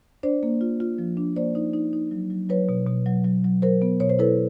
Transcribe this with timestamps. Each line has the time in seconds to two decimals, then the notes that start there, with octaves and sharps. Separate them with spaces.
0.23 D4 C5 D5
0.43 A#3
0.61 F4
0.80 F4
0.98 F3
1.17 D4
1.36 A#3 C5 D5
1.55 D#4
1.74 D#4
1.93 D#4
2.11 F#3
2.30 F#3
2.49 F#3 B4 C#5
2.69 B2
2.87 B2
3.06 F#3
3.25 F#3
3.45 F#3
3.62 F#3 A#4 C5
3.82 B3
4.00 B2 C#5
4.09 C5
4.19 E4 A4 B4